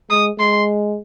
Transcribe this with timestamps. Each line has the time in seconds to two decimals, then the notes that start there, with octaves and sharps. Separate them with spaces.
0.10 G#3 D#6
0.39 G#3 C6